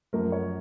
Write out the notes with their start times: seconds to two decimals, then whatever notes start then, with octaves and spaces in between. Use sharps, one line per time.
0.13 F#2 F3 A3 A#4
0.32 C#5